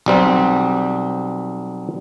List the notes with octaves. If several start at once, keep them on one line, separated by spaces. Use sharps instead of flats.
B1 G3 C4